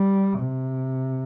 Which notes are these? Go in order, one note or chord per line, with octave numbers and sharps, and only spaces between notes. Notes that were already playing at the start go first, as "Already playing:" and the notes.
Already playing: G3
C3